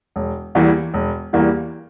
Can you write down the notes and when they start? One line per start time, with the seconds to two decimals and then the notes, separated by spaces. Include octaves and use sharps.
0.16 E1
0.55 E2 E3 G3 A#3
0.94 E1
1.33 E2 E3 G3 A#3